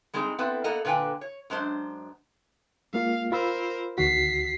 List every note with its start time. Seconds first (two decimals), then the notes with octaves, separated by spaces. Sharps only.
0.14 G3 G#3 C4 D#4 G#4
0.38 B3 C4 E4 A4 B4
0.64 A#3 B3 A4 A#4 D#5 F#5
0.85 A#2 D3 B4 G5 G#5
1.21 C#5
1.50 F#2 G#3 D4 C5
2.94 G#3 A#3 F4 F5
3.32 F4 A#4 C5 B5 E6
3.98 D2 D#3 F#4 B6 C7